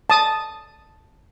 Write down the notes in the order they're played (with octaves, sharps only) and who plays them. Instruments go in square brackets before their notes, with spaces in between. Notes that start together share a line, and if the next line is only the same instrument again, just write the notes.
[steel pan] A5 D#6